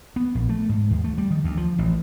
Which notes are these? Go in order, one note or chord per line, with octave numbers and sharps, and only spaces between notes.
B3
A#1
A3
G#2
D#2
A3
G3
D#3
D2
F3
A1